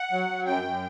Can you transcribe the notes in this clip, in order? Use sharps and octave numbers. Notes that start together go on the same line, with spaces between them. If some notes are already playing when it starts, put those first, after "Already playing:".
Already playing: F#5
F#3
F#3
F#2 G5
F#2